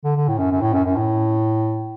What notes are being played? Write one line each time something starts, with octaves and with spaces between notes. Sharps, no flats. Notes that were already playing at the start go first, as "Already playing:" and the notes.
D3
D3
A2
F#2
F#2
A2
F#2
F#2
A2